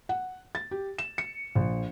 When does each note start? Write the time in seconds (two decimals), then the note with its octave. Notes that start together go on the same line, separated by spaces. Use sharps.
0.09 F#5
0.55 A6
0.71 G4
0.98 E7
1.18 C#7
1.55 A#1